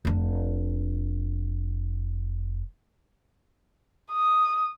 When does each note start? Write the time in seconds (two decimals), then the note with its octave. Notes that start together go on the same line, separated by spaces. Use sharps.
0.05 F1 D4
4.11 D#6